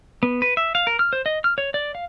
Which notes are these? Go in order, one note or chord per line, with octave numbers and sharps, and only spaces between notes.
B3
B4
E5
F5
A#4
F6
C5
D#5
F6
C#5
D5
F5